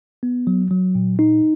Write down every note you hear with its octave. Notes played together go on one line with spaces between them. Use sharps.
B3
F#3
F#3
A#2
D#4